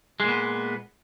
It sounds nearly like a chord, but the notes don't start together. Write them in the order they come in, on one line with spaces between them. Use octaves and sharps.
G#3 A#2 B3